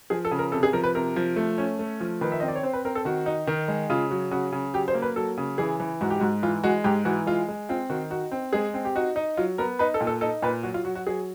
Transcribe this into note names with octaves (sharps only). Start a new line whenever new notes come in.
F3 G#4
A4
C#3
A#4
C3 A4
G#4
F3 A#4
B4
C3 A#4
F3
A3
C#4
A3
F3
D#3 B4
E5
C4 D#5
D5
C#5
C4 C5
B4
C4 A#4
A4
D#3 F#4
D#4
D#3
G#3
C#3 F4
F#3
C#3 F#4
C#3
F#3 G4
C5
A#3
B4
F#3 A4
C#3
E3 G#4
E3
G#2 F#4
G4
G#2 F#4
E3 F4
G#3 F#4
G#2 G4
E3 F#4
G#3 F4
G#3
C4 F4
D#3 F#4
D#4 F#4
C4
G#3 G#4
C4
G4
D#4 F#4
D#4
F#3 F4
B3 A#4
D#4 B4
A4
A#2
A4
D#4 A4
A#2 B4
F#3 F#4
F4
F#3 F#4
F#4
F#3 G#4